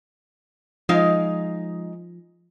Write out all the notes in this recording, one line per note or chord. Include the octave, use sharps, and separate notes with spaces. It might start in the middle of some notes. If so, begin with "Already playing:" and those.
F3 G#3 D#4 F5